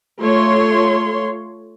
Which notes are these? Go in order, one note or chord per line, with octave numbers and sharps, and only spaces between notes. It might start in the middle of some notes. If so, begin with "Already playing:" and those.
A3 F4 C#5 C6